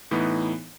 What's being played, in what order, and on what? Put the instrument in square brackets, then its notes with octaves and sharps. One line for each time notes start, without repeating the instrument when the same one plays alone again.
[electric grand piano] A2 E3 B3 D#4